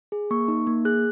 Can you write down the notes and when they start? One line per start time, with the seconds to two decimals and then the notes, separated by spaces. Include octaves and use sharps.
0.12 G#4
0.31 A#3 C#6
0.48 D#4
0.67 A#3
0.85 G#4 F#6